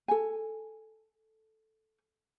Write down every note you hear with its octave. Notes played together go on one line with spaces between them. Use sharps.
A4 G#5